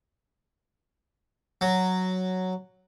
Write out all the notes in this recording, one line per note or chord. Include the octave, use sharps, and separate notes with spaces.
F#3